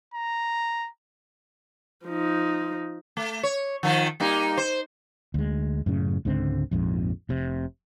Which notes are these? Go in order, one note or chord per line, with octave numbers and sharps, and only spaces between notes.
A#5
F3 D#4
A3
C#5
D#3 F3
G3 A#3 D#4
C5
D2 G#3
F#2 A2 C#3
C#2 G#2 D3 C4
A#1 F2 G#2
F1 C3